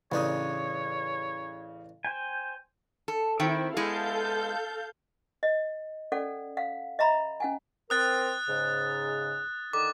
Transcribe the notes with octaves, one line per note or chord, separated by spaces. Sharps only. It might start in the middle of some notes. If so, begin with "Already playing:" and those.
A1 C#3 D4 D#4 C#5 D#6
C5 G5 G#5
A4
D#3 C4 E4 E5 G5
G#3 B3 E4 A4 F5 G6
D#5
C#4 A4 D5 F#5
F5 F#5
D#5 E5 A#5 B5
C#4 F#5 G#5
C4 A#4 D#6 F#6 A6
G#2 C#3
D3 D#3 D#4 D6